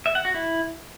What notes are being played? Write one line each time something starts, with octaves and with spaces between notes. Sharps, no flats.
E5
F#5
F#4
E4